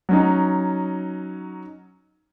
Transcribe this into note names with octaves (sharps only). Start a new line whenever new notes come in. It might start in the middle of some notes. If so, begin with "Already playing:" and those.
F#3 C#4 D#4